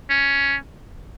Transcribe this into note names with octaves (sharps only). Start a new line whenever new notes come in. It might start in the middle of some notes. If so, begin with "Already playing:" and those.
C#4